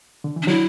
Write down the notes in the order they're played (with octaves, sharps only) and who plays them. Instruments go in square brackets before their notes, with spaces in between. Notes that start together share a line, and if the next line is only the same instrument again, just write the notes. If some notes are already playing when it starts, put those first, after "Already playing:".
[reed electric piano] D3
E3
[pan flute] D4
[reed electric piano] D3 F#3 [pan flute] E4